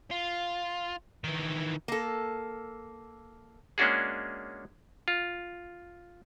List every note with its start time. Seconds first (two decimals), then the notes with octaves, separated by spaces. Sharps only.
0.11 F4
1.24 D#3 E3
1.88 A#3 A4
3.78 G#3 A#3 C#4 D4 F#4 G#4
5.08 F4